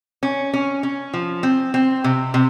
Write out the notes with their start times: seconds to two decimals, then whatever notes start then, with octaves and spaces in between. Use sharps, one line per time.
0.23 C#4
0.54 C#4
0.83 C#4
1.14 F3
1.43 C4
1.74 C4
2.04 C3
2.34 C3